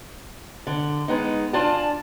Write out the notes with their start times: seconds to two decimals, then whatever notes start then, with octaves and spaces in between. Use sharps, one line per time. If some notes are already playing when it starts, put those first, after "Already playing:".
0.67 D3
1.08 G#3 B3 D#4
1.53 D4 F4 D5 G#5 A5